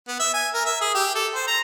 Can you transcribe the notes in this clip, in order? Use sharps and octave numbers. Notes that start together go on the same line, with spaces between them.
B3
E5
G#5
A#4
E5
G#4
G4
A4
C5
A#5